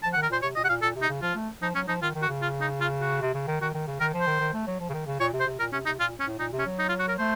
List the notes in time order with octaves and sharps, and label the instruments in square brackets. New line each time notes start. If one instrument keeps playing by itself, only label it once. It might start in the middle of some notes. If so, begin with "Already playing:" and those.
[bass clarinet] F3 [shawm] A5
[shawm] F#5
[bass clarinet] D#3
[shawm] A#4
[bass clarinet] A#2 [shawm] C5
[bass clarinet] C3 [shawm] C#5
[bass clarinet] A#2 [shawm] D#5
[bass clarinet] C3 [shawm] F#5
[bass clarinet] A#2 [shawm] F5
[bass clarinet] A#2 [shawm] A4
[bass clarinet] C3
[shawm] D#4
[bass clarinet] C#3
[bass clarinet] F3 [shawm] F4
[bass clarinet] A3
[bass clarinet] F3 [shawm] D#4
[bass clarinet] F#3 [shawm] C#4
[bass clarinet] F3 [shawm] D#4
[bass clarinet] D#3 [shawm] F4
[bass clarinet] D#3
[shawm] F#4
[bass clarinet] C#3
[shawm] F4
D#4
F4
F#4
[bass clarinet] C3
C#3
D#3
[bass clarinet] D#3 [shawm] F#4
[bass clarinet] D#3
C#3
[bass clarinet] D#3 [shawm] A#4
[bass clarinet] F3
[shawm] C5
[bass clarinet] D#3
D#3
A3
F#3
F3
C#3
D#3
C#3
[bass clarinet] A#2 [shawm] C#5
[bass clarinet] C3
[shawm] C5
[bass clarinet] C3
[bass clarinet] A#2 [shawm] A#4
[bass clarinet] C3 [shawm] C#4
[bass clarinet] C3 [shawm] D#4
[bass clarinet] A#2 [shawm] F4
[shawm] C#4
[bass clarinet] A2
[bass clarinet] A#2 [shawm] D#4
[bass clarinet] C3
[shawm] C#4
[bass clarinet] F#3
[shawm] D#4
F4
F#4
A#4
[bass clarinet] A3 [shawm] C5